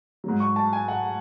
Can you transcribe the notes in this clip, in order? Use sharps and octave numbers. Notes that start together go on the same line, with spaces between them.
G#2 F#3
C#6
A5
G#5
F#5